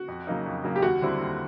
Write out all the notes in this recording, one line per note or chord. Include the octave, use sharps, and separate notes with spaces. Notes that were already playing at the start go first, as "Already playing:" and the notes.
Already playing: F#4
F2
C#3 F#3 A#3 D#4
F2
C#3 F#3 A#3 D#4
G4
D#2 F#4
D3 G3 C4 E4
D#2